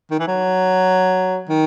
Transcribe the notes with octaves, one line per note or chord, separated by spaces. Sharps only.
D#3
E3
F#3
D#3